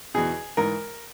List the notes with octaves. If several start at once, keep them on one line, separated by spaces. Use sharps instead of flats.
E2 B2 G#4
G#2 E3 A#4